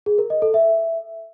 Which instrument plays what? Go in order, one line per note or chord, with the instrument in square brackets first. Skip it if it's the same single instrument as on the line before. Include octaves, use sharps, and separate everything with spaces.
[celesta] G#4
A#4
D#5
A4
E5